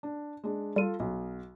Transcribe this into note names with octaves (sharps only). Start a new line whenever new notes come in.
D4
G#3 D4
G3 F4 A4 D#7
B1